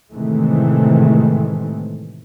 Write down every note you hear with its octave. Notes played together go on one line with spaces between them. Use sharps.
A2 C3 D#3 E3 G#3 A3